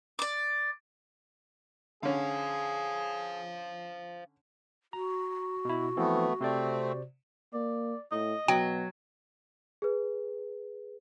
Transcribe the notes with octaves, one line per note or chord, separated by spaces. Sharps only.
D5 D6
D3 C#4 G#4 C5 F5
F#4 A#5
B2 E4
E3 F3 A3 B3 C4
C3 A3 C4 C5 D5
A#3 D5
A2 D#5
B2 F#3 G5
G#4 B4